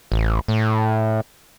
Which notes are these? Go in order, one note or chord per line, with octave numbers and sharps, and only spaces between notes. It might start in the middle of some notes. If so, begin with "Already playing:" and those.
A1
A2